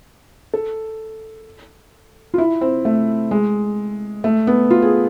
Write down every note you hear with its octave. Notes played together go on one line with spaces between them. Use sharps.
A4
F4
E4
C4
A3
G#3
A3
B3
F4
G#4